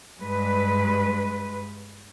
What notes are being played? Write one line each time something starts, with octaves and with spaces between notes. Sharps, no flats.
G2 G#3 B4